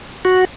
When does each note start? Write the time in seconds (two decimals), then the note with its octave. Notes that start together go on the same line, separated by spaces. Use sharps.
0.25 F#4